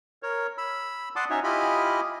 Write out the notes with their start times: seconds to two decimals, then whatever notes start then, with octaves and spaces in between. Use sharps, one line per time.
0.23 A#4 C#5
0.58 B5 E6
1.16 D5 F#5 A5 C6 D6 D#6
1.30 C#4 D#4 F#4 C#5 E5
1.44 E4 F4 G4 D#5 G#5 B5